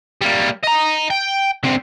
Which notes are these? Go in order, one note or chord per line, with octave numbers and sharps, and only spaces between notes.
G3 A#3
D#5 A#5
G5
D3 C4